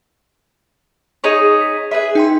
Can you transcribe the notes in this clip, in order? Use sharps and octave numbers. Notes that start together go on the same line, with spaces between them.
D#4 G#4 C#5
B6
G#4 B4 E5
D#4 G5 C6